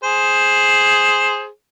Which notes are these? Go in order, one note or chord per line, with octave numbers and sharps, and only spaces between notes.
G#4 C5